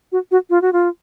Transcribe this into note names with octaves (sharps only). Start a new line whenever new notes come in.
F#4
F#4
F4
F#4
F4